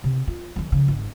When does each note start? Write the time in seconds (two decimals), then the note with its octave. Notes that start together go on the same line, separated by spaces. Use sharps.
0.04 C3
0.27 F4
0.56 D#3 F#3
0.72 C#3 F3
0.88 G#1